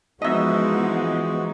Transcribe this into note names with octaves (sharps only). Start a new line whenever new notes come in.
E3 F3 G#3 B3 D#4 F#4 D#5 E5